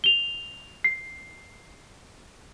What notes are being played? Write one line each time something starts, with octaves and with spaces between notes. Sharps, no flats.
F7 G7
C7